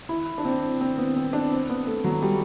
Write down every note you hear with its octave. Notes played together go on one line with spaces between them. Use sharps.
E4
D4
C4
C4
B3
C4
D4
C4
B3
A3
F#3
G3